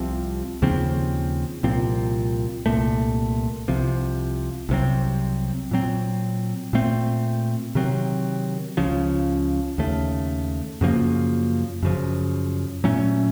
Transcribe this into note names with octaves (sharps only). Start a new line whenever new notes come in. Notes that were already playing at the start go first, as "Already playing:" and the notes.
Already playing: C2 C3 F3 C4
D#2 C#3 F3 C4
C2 A#2 F3 C4
C2 A#2 A3
C2 C3 F3
C2 C3 F#3 C4
A#2 F#3 C4
A#2 A3 C4
C3 D#3 F#3 C4
C#2 C#3 F3
D#2 C#3 A3
F#2 C#3 F3 A#3
F#2 C#3 F3
A#2 F#3 A3 C#4